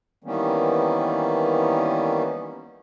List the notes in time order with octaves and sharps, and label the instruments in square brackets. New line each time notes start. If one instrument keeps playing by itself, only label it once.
[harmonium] D#3 E3 G3 A#3 B3 C#4